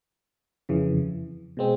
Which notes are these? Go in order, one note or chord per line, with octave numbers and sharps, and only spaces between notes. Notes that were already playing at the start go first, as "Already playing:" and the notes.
F2 C#3 E3
B2 G#3 C4